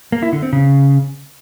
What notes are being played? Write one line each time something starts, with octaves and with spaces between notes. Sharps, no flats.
A#3
E4
D3
C4
C#3